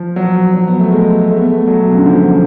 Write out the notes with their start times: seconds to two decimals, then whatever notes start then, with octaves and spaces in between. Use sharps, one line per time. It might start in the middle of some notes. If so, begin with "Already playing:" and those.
Already playing: F3
0.16 F#3
0.54 F#3
0.67 B3
0.80 A3
0.92 G#3
1.30 A3
1.37 B3
1.44 A3
1.67 F#3
1.85 B2
1.91 C#3
1.98 D3
2.06 F3